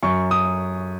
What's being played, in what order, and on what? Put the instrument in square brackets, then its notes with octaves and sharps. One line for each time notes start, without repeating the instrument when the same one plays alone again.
[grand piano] F#2 C#6
D#6